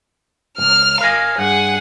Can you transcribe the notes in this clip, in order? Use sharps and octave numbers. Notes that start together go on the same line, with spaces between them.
C#2 G2 F6 F7
A#4 D#5 F5 G#5
G2 G#4 F#5